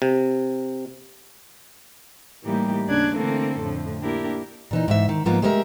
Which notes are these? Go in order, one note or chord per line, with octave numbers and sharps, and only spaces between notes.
C3
A2 E3 G3 A#3 D#4 G4
D#2 C#3 D4 D5 F#6 G#6
D3 E3 A3 A#3 C4 A4
F2 A2 D3 F3 A3
A#3 D4 E4 G4 A#4
A#2 E3 D#4
G#2 E3 E5
D#3
G#2 F3 A#3 B3 F4
G#3 A3 B3 G4 A#4 E5